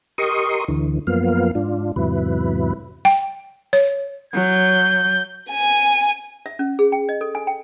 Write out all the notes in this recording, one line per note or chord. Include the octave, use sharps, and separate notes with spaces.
G4 A#4 D#5 C6 C#6 D#6
D2 D3 E3
F#2 F3 A#3 B3 F5
G#2 D4 F4
E2 G#2 C3 F#3 E4 B4
G5
C#5
F#3 G6
G#5
E5
C#4
G#4
G5
D#5
A4
G#5
G5